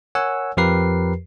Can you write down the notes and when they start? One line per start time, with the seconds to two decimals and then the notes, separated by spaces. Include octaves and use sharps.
0.15 A#4 C#5 F#5 G#5 E6
0.57 F2 F3 G4 A#4 B4 C7